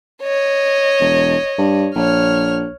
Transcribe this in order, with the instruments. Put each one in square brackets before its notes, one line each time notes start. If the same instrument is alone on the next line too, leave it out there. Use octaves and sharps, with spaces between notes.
[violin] C#5 D#5
[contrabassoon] E1
G2
[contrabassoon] A#1 [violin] C#5 F6